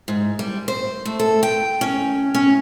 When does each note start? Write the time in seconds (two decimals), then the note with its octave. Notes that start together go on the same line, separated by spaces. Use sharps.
0.08 G#2
0.39 G3
0.68 C5
1.05 A3
1.19 A4
1.43 G5
1.81 C#4
2.34 C#4